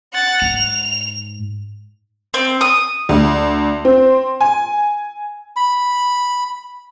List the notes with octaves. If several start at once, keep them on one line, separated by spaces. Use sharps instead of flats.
F#5 A6
G#2 F7
C4
D#6
D2
C4
G#5
B5